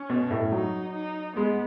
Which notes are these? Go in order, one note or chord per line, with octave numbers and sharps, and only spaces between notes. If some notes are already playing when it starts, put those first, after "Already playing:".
Already playing: C#4
B2
A2
F#3 D#4
D#4
G#3 B3